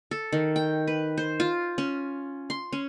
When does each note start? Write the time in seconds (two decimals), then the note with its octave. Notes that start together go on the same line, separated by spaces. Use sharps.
0.11 A4
0.33 D#3
0.56 G5
0.87 B4
1.18 C5
1.40 F4
1.78 C#4
2.50 C6
2.73 C#4